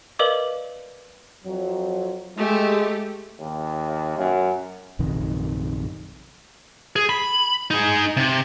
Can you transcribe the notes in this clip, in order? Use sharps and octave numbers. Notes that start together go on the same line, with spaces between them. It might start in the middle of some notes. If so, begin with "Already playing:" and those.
A#4 B4 D5 D#5 F5 D6
F2 F#3
G#3 A3 G4
D#2
F#2
A#1 F#2 C3 D#3
G#4
B5
D#4 G#4
C3